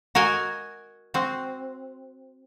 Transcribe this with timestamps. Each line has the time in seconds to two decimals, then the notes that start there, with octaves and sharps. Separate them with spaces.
0.15 F#4 A#4 D#5 G#5
1.14 C4 F#4